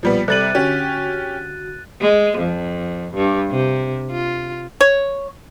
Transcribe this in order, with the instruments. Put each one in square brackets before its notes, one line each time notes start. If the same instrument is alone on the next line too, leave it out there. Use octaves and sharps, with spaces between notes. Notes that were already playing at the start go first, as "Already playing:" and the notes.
[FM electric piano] B1 A#2 [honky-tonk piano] F3 G3 B3
[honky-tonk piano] C3 G3 F#7 [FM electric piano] A4 [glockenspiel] F#6 A6 D#7
[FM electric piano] D3 F#4 [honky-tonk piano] C#4 G4
[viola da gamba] G#3
F2
G2
C3
F4
[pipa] C#5